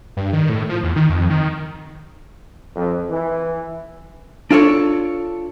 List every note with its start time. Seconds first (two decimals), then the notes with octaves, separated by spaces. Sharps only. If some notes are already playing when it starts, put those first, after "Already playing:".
0.17 G2
0.33 D#3
0.49 A2
0.69 F3
0.83 E2
0.96 D#3
1.10 F2
1.30 D#3
2.76 F2
3.09 E3
4.51 D4 F4 A4 C#5